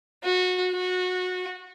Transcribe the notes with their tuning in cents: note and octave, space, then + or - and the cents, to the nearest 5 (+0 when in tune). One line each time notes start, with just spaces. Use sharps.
F#4 -20
F#4 -20